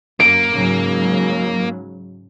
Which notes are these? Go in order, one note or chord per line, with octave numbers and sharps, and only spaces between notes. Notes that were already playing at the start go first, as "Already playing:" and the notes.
F#2 A#3 D7
G#2 C#3 F#3